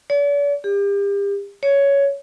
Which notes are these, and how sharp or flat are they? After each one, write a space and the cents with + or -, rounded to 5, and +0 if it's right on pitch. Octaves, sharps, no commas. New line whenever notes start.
D5 -45
G4 +35
C#5 +10